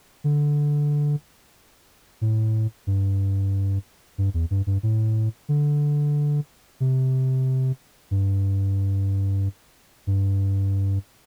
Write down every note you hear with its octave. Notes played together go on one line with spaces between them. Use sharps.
D3
A2
G2
G2
E2
G2
G2
A2
D3
C3
G2
G2